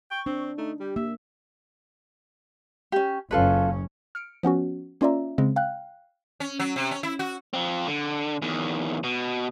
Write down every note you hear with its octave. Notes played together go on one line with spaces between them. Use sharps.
G5 C#6
C4 D4
A3 D#4
G3 G4
A#3 E5
C#4 G4
F#1 C#4 F4 A4 B4
F6 C#7 D7
F3 B3 C#4 F#4
A#3 C#4 F4 D5 E5 A#5
C#3 G#3 C4
F5 G5 F#6
C#4
F#3
C3
C#4
E4
F#4
F3 C4
D3
E2 D#3
B2